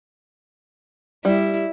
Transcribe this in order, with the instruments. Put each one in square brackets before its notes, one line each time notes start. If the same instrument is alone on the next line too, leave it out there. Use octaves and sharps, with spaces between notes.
[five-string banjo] G3 [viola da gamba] E4